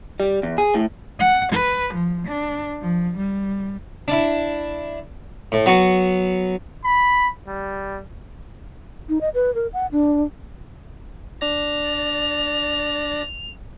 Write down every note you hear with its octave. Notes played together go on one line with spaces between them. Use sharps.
G3
E2
G#4
A2
F#5
B4
F3
D4
F3
G3
D4 E4
A2
F#3 B3 F#4
B5
G3
D#4
D#5
B4
A#4
F#5
D4
D4 D5 A#6 F7